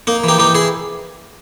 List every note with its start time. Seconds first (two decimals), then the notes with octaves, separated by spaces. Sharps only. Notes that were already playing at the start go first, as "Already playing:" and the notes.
0.07 A#3 D#4
0.24 E3 D#4 G4
0.38 E3 D#4 G4
0.55 E4 G#4